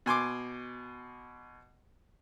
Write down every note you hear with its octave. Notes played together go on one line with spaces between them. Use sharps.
B2 G#5 C6 D6